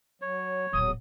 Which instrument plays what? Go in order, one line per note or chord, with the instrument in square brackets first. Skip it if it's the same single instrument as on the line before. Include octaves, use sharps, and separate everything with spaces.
[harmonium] F#3 [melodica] C#5
[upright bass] D1 A#1 [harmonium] E2 F#3 [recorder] D#6